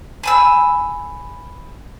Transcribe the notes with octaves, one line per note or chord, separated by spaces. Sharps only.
G#5 B5 E6